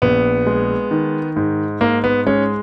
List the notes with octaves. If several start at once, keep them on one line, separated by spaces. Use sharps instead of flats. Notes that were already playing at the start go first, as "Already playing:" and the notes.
A#1 B3
G#3
D#3
G#2
G#2 A#3
B3
G#3 C#4